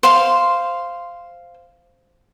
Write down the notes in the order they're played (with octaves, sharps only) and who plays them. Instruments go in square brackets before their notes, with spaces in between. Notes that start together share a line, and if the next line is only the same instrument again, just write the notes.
[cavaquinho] C5 F5 C6